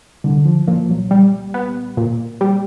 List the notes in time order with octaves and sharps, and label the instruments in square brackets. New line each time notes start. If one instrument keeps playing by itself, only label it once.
[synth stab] C2 [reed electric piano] D3
[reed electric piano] F3
[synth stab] A#2 [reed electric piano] F3
[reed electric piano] F#3
[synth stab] G3
B3
A#2
G3